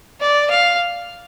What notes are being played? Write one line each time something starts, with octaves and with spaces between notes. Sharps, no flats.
D5
F5